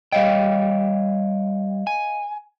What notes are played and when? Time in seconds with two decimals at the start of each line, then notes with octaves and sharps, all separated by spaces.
0.12 G3 C#5 D#5 F5 G5
1.87 G#5